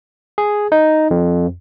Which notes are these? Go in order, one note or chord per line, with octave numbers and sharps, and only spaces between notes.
G#4
D#4
F2